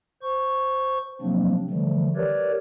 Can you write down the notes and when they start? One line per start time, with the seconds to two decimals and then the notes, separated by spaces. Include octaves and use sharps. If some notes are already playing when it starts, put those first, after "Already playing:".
0.22 C5 C#6
1.22 C3 F3 F#3 A#3 C4 D4
1.70 D3 E3 F3 G3 A3
2.16 G4 A#4 B4 C#5 D5